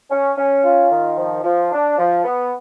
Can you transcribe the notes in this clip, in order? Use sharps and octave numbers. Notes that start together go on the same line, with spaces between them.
C#4
C#4
F4
D#3
F3
F3
D4
F3
B3